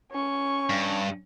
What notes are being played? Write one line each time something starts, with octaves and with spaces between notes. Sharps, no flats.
C#4 C#6
G2